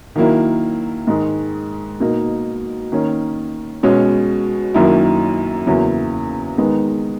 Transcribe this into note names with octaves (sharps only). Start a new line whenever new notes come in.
D#3 F#3 A#3 E4
G#2 D#3 G#3
B2 A#3 D#4
D#3 A#3 C#4
B2 G#3 C#4
F#2 D#3 F#3 A#3 E4
E2 C#3 F#3 A#3 E4
D#3 G#3 B3 D#4